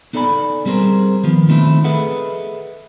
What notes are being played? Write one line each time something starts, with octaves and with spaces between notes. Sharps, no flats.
B3 D#4 A4 D5 G#5 B5
G3 C4 G#4 A#4 C5
D#3 F3 B3
D#3 A3 C4 D#4 E4
G#4 A4 B4 D#5 E5 F#5